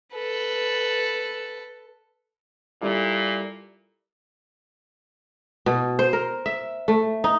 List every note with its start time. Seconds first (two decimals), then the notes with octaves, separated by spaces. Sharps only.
0.14 A4 B4
2.82 A#2 G3 E4 A4
5.66 B2
5.99 C5
6.13 A#4
6.46 E5
6.88 A3
7.24 D#4